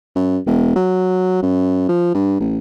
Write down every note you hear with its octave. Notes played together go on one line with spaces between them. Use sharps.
F#2
E1
F#3
F#2
F3
G2
A1